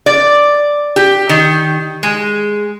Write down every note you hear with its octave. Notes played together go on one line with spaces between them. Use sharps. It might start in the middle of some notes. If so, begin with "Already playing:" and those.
D5
G4
D#3
G#3